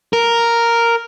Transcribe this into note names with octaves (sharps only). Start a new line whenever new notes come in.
A#4